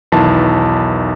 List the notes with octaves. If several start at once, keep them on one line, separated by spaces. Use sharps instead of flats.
B1 E2 D#3 E4 B4 A5